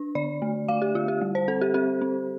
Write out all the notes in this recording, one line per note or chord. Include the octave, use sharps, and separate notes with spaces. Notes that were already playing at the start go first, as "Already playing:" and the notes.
Already playing: D4
D3 D5
A3
A3 F5
G4
D3 F4
G4
G3
C5
C4 A4
G4
C4 G4
C4